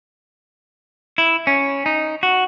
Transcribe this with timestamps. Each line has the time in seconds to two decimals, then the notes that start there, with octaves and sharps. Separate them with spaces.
1.18 E4
1.47 C#4
1.86 D#4
2.23 F#4